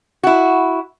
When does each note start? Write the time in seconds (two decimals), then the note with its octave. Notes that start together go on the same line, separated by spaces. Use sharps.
0.23 E4 F#4